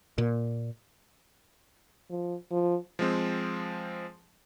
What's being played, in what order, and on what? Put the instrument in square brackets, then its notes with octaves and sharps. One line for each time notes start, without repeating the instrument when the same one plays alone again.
[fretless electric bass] A#2
[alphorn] F3
F3
[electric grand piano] F3 G#3 C4